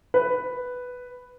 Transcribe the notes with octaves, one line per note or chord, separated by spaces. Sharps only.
B4